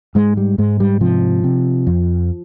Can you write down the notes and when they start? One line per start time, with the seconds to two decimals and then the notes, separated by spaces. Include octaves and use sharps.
0.15 G#2 G#3
0.37 G3
0.58 G#2 G#3
0.80 G3
1.01 C3 F3
1.44 C3
1.87 F2